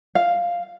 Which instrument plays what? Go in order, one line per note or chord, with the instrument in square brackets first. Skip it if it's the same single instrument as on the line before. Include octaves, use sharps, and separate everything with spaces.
[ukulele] F5